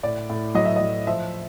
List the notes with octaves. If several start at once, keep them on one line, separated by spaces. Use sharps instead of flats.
A2 D5
A2
F#3 D#5
E5
F#3 D#5
F3 E5